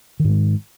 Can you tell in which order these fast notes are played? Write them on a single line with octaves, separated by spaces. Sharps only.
D#3 G#2 G#3